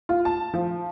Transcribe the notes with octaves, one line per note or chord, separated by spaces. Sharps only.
F4
A5
F3